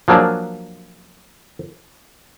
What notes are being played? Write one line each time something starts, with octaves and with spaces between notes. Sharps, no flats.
F3 F#3 A#3 D4 G#4